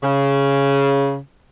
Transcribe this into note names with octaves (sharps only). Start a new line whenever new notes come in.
C#3